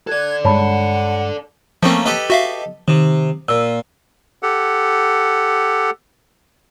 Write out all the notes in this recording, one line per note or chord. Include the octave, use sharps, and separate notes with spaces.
A4 D5 F#6 G#6
G2 G#3 C#5 F#5 A5 B5
F3 A3 A#3 C4 C#4
G4 A4 B4 D#5
F#4 E5 F5
C3 D#3
A#2 E6
G4 A4 F#5